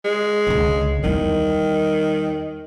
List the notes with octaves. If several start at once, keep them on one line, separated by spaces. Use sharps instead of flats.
G#3
C#2 D3
E2 D#3 G3